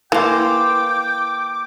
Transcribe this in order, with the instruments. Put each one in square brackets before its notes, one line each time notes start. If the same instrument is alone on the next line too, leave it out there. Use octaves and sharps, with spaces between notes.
[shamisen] E3 [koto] A#3 C5 [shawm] G5 [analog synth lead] D6